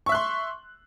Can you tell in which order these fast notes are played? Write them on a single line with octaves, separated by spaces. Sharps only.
C#6 E5 F#6 C6